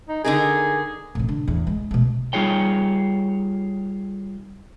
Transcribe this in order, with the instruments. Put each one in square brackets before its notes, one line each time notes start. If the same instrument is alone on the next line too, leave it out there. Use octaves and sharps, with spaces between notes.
[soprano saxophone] D#4
[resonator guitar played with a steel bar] D3 D#4 A#4 [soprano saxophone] G#4
[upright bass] A2 C3
D3
E2 A2
D2 G#3
B2 A3
[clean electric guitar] G3 D#4 F4 G#4 C#5 G5